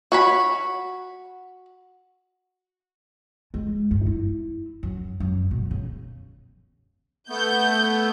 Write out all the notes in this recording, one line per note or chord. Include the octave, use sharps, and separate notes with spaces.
F#4 C#5 B5
G#3
G2
E4
F#2
F#2
B2
C#3
A3 B3 G6